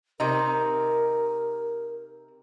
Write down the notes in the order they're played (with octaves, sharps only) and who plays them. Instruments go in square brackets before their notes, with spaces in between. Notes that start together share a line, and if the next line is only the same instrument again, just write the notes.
[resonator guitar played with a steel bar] C3 D#4 [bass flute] A#4